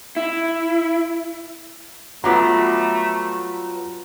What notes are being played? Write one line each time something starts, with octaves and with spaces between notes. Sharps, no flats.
E4
F#3 G3 A3 B3 F4 F#5 A#5